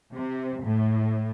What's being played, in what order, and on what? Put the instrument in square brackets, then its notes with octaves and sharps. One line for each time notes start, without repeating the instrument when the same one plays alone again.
[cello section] C3
A2